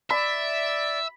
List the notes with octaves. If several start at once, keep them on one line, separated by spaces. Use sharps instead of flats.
D5 E5 B5